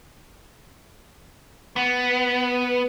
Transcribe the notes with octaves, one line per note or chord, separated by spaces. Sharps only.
B3